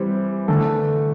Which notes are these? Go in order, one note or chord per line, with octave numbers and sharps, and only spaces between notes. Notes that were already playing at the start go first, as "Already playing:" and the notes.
Already playing: E3 G3 C4 G4
D3 E3 A3 D4 A4